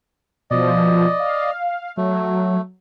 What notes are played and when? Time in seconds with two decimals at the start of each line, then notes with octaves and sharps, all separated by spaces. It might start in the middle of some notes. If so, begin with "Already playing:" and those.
0.51 B2 F3 D5 D#5
1.20 F5
1.97 F#3 A3